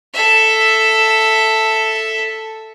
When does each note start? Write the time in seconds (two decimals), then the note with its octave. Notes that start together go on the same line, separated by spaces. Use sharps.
0.14 A4 E5